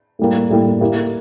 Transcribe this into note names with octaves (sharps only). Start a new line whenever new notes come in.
A2 G3 A#3
A2 G3 A#3
A#3 E4 G4